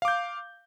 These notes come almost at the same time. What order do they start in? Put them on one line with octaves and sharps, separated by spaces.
F5 D6 G6